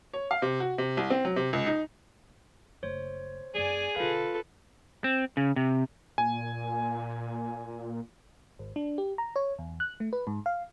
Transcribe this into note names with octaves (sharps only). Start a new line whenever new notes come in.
C#5
F5
C3
F#4
C3
C2
C4
F#3
C3
C#2
D#4
F#1 A3 C5 C#5
F#2 A#3 G#4 D5 G#5
B1 D3 F4 A4 B4 F5
C4
C#3
C3
A#2 G#5
G#1
D4
G4
A#5
C#5
E2
F#6
A3
B4
G#2
F5